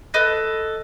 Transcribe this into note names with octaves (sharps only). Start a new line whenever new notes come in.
A4 B4 D#5